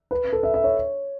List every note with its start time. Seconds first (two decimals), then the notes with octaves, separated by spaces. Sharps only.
0.11 B4
0.33 A4
0.43 E5
0.54 E5
0.64 C#5